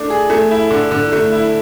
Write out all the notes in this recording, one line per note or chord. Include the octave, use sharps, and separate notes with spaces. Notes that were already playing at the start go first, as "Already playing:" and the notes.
Already playing: A3 D4
G#4
A3
E4
D3
D3
A3
E4